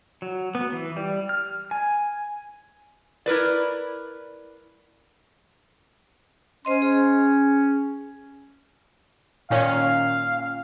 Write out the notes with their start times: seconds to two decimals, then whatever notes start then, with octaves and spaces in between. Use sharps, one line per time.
0.22 F#3
0.55 B3
0.73 E3
0.97 G3
1.29 F6
1.71 G#5
3.26 E4 A#4 B4 D5
6.65 C#4 C5 D#5 C6
6.82 G#4
9.50 A#2 D#3 C#4 F5